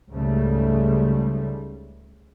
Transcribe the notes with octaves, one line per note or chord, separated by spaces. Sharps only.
C#2 G#2 C#3 G3 A3